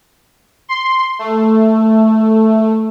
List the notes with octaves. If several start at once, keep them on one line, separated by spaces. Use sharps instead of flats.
C6
A3